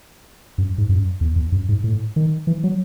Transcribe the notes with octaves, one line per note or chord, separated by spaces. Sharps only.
F#2
G#2
F#2
E2
E2
F#2
G#2
A2
D#3
E3
F#3